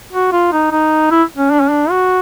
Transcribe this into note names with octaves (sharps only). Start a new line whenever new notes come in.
F#4
F4
D#4
D#4
E4
C#4
D4
C#4
D4
F#4